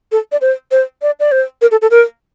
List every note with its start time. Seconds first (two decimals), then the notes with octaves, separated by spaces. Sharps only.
0.12 A4
0.32 D5
0.41 C5
0.71 C5
1.02 D5
1.20 D5
1.32 C5
1.62 A#4
1.71 A4
1.82 A4
1.91 A#4